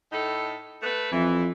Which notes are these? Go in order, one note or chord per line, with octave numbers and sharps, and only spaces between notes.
A2 D#4 A4
A3 B4
F2 E3